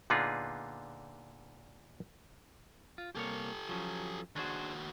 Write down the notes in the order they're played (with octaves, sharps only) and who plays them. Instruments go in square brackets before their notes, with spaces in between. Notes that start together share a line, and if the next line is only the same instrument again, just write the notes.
[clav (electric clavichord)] A#2 D3 B3 D#4 F4 G#4
[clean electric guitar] F4
[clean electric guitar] C2 A#3 C#5 [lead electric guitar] G4 A4
[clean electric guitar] F3 F#3 C#4
[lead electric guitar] D#2 F#4 [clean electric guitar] D4 G#4 C5